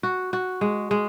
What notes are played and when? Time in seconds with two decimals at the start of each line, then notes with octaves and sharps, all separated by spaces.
0.03 F#4
0.33 F#4
0.61 G#3
0.91 G#3